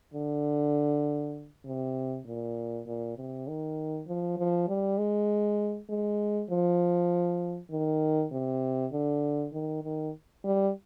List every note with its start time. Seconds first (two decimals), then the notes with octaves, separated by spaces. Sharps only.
0.14 D3
1.66 C3
2.27 A#2
2.86 A#2
3.17 C3
3.48 D#3
4.07 F3
4.38 F3
4.69 G3
4.98 G#3
5.89 G#3
6.50 F3
7.71 D#3
8.32 C3
8.92 D3
9.53 D#3
9.84 D#3
10.44 G3